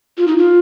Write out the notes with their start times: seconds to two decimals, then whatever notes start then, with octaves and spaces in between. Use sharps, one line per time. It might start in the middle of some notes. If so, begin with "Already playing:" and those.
0.18 F4
0.28 D#4
0.38 F4